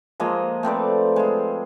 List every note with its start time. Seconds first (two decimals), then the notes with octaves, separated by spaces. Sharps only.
0.20 F3 G#3 A#3 D#5
0.63 A3 C4 B4 D5
1.16 G#3 F4